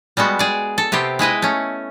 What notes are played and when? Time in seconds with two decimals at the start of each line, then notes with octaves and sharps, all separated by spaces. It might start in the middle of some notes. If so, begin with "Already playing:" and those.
0.17 G3 G#3 B3 F#4
0.39 G#4 D5
0.78 A4
0.92 C3 B3 C4 G4
1.19 G#3 E4 B4 D#5
1.42 A3 C#4